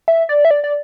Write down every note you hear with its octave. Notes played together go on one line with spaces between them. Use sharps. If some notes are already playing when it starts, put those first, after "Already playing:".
E5
D5
E5
D5
D5